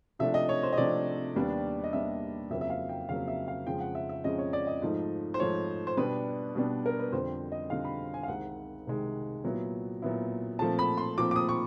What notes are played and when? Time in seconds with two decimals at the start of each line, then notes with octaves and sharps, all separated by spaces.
0.19 C3 F3 A3 D4 E5
0.34 D#5
0.49 C#5
0.63 C5
0.73 D#5
0.77 C3 F3 A3 D4 D5
1.36 D#2 D#3 G3 B3 D4
1.84 D#5
1.93 D#2 D#3 G3 B3 D4 E5
2.50 F2 C#3 F#3 A#3 E5
2.61 E5
2.70 F5
2.89 G5
3.09 F2 C#3 F#3 A#3 F5
3.28 E5
3.48 F5
3.66 F2 C#3 F3 G#3 C#4 G5
3.81 F#5
3.95 E5
4.09 E5
4.24 F2 C#3 F3 G#3 C#4 D#5
4.39 C#5
4.53 D5
4.67 D#5
4.82 G#2 F3 A3
5.34 C5
5.40 G#2 F3 A3 C#5
5.87 C5
5.97 B2 G3 B3 D4 B4
6.55 B2 G3 B3 D4
6.86 A#4
6.99 B4
7.12 F2 D3 G3 C5
7.52 D#5
7.70 F2 D3 G3 F5
7.85 B5
8.14 G#5
8.23 F5
8.28 C2 C3 D#3 G#3 F#5
8.87 C2 C3 D#3 G#3
9.44 A#2 F#3 B3 E4
10.02 A#2 F#3 B3 E4
10.59 A#2 F3 A3 C4 A5
10.79 B5
10.98 C6
11.18 A#2 F3 A3 C4 D6
11.31 D6
11.36 D#6
11.49 C#6